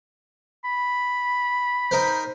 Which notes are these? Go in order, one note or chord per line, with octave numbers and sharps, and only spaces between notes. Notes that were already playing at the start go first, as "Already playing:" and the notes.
B5
D#4 A#4 C5